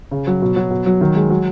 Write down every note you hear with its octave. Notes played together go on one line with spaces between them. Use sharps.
C#3
F#3
B2
F#3
B2
F#3
D#3
G#3
F#3